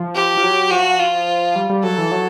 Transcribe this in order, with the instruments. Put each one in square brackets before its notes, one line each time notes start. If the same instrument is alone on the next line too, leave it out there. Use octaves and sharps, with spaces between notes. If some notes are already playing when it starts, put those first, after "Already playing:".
Already playing: [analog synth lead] F3
[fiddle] G4
[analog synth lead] F3
F#3
[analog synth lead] F3 [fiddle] F#4
[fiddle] F4
[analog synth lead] G3
G3
[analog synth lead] F#3 [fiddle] A4
[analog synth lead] E3
F#3